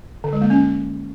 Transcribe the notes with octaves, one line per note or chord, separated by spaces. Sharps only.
D3
G#3
A#3
C#4